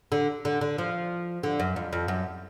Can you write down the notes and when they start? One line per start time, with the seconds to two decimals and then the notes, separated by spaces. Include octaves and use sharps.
0.12 D3
0.45 D3
0.61 D3
0.78 F3
1.43 D3
1.60 F#2
1.76 F2
1.93 F2
2.08 F#2